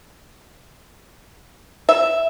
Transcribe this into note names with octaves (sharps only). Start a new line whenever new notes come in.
E5